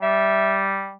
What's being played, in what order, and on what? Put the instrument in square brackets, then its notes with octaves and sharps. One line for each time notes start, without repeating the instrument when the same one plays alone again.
[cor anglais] G3 [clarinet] E5